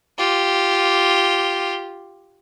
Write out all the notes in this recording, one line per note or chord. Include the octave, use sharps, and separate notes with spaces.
F4 G4